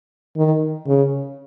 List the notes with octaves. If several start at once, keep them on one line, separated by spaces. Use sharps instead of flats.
D#3
C#3